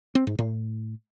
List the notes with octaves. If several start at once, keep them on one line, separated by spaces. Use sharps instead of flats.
C4
G#2
A2